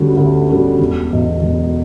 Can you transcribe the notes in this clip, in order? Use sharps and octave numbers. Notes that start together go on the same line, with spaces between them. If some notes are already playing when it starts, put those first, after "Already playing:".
Already playing: D2 D3 G3 C#4 F#4
D2
D3 G3 C#4 F#4
E1
E2 B2
E1